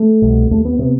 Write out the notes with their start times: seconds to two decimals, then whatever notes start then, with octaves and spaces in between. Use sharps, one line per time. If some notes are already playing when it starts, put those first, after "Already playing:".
Already playing: A3
0.22 C2 B2
0.51 D#2 A3
0.65 B3
0.79 C3 B3